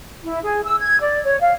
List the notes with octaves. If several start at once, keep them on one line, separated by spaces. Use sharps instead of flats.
E4
G#4
E6
G#6
D5
C#5
F5